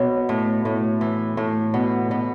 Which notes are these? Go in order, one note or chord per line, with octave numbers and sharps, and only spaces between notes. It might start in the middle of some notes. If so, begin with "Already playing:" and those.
Already playing: B2 C#5
A2
A2
E3
A2
B2
B2